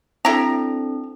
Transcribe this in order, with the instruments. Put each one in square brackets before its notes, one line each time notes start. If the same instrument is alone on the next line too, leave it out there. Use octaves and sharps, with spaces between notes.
[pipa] G3 E4 A#5 [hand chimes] C4 D4 A4